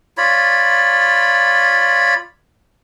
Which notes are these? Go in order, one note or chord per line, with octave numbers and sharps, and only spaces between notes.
F4 C#5 D5 B5